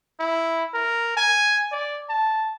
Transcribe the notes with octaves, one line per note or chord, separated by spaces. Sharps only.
E4
A#4
G#5
D5
A5